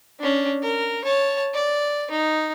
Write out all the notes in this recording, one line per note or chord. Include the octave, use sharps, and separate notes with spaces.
C#4 D4
A#4
C#5 A5
D5
D#4